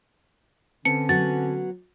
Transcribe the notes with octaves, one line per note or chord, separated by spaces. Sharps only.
D3 C4 C#4 B4 A5 C#7
F#3 B3 F#4 A6